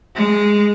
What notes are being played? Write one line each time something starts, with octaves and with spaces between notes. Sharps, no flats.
G#3